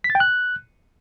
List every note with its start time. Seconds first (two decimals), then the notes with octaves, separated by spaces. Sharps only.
0.04 B6
0.10 A6
0.15 G5
0.20 F#6